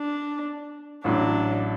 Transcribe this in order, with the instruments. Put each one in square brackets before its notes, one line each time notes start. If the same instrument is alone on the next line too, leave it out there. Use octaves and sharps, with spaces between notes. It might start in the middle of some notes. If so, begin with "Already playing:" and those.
Already playing: [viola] D4
[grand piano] A1 A2 F#3 [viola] D4